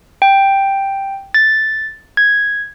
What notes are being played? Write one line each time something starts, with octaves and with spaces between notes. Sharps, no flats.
G5
A6
G#6